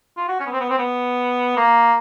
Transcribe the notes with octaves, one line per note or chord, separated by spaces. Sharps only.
F4
F#4
C#4
B3
C4
B3
C4
B3
A#3